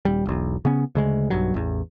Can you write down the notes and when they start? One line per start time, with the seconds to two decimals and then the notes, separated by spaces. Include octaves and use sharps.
0.05 D#1 G3
0.26 E1 B1
0.65 C#3 B3 C#4
0.95 D2 C#3 G#3
1.30 B1 G2 F#3
1.54 A1 E2